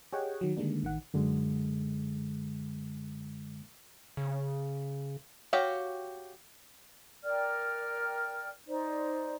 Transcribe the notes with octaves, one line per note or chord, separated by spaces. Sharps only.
G4 G#4 C#5 D#5 F#5 G5
D#3 F#3
D3 D#3 G3 G#3 A#3 D4
A1 D#3 F#5
F#2 D3 G#3
C#3
F#4 G4 C#5 F5
A#4 D5 G5 F6
D#4 C5 D5